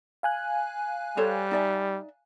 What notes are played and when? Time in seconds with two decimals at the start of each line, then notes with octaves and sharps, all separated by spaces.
0.23 F5 G#5 F#6
1.17 G3 A4 C5 C#5
1.51 D#4 D5 E5